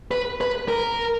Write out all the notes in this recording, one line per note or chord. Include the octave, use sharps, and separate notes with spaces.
B4
B4
A#4